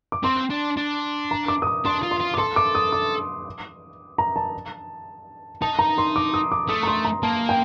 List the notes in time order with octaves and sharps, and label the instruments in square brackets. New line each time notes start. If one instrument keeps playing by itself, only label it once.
[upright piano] D6
[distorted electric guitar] C4 [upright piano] C6
[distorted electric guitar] D4
D4
[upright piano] A#5
D6
D#6
D6
[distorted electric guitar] D4 [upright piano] C6
[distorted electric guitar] F4
[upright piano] C6
[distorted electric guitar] F4
[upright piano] D6
[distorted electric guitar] A4 [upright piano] C6
[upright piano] D6
D#6
D6
A#5
A5
[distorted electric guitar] D#4 [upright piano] A5
[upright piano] A#5
C6
D6
D#6
D6
[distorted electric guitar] A3 [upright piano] D#6
[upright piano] A#5
C6
A#5
[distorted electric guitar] A#3 [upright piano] A5
[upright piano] G5